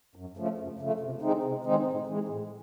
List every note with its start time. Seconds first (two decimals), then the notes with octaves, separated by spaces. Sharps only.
0.16 F#2
0.37 C#3 F3 A3
0.58 F#2
0.79 C#3 F3 A3
1.00 C3
1.22 D#3 G#3 C4 D#4
1.43 C3
1.64 D#3 G#3 C4 D#4
1.86 A2
2.07 E3 G#3
2.28 A2